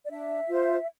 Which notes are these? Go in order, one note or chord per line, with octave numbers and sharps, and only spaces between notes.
D5
D4 E5
F4 C5